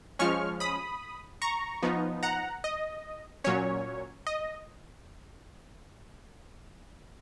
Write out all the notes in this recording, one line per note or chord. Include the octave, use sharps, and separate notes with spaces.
F3 G#3 C#4 C#6 F6
B5 D#6
A#5 C#6
F3 B3 D#4
F#5 A#5
D#5
A#2 F#3 C#4 C#5
D#5